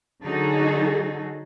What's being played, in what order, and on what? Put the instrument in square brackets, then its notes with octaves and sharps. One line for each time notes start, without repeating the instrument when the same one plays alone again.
[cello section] D3 F#3 D#4 F#4 G#4 A4